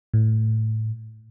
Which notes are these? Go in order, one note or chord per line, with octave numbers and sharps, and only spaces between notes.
A2